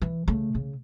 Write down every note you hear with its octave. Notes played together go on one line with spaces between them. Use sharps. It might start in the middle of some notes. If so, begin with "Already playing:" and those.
E3
C#3 A3
C#3